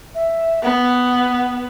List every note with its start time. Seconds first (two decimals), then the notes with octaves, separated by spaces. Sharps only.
0.15 E5
0.63 B3 F#5